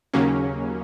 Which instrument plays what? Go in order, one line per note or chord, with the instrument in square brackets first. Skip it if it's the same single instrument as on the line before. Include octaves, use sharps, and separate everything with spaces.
[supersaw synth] D#2 C#3 F#3 A#3 C#4